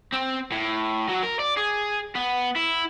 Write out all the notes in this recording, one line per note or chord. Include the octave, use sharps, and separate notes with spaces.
C4
A2
F#3
A#4
D5
G#4
B3
E4